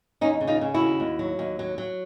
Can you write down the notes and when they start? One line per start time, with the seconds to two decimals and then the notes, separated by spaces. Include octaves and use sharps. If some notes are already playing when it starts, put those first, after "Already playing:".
0.21 D#2 C#4 D#4
0.41 C#3
0.47 D#4 F4
0.61 C#3
0.74 E4 F#4
0.80 D#2
1.00 D#2
1.19 F#3
1.39 D#2
1.59 F#3
1.78 F#3